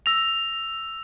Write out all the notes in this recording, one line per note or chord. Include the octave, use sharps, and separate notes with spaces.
E6 A#6 F7